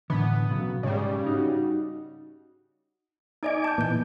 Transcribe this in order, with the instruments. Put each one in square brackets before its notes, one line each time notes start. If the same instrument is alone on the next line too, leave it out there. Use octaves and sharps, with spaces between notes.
[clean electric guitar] A2 D3 E3 [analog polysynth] B3
[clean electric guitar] B1 C#3 F#3
[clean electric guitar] G#2 [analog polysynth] C#3 G3
[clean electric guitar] D#4 F#4
[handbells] D#4 D5 D#5 [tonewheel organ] G#5 D6
[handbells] A5 G6
[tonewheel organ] A#2 E3 B3 [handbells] A3 G6